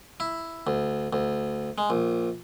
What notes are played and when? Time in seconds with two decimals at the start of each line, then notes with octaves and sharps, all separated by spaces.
0.20 E4
0.67 D2
1.13 D2
1.78 G#3
1.90 A#1